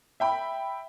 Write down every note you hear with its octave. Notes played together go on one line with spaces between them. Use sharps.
E5 G5 B5